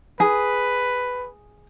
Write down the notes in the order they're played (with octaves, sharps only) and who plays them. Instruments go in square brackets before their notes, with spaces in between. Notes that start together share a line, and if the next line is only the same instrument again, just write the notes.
[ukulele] G#4 [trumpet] B4